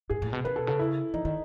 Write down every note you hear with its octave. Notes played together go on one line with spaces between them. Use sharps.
G#2 G#4
A2
B2
C#3 B4
B2 A4
C#3 A4
E4
E3 D#4
D#3 D#4